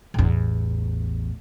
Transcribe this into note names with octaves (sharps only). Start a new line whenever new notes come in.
A1 E2